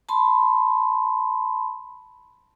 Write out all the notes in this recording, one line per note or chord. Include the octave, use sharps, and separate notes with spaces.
A5 B5 C6